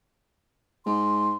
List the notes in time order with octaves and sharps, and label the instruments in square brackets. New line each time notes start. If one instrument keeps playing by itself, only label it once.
[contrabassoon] G#2 [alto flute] C6